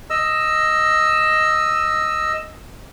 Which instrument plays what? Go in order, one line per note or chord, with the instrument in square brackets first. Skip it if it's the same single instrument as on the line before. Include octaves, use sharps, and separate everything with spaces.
[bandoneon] D#5 E6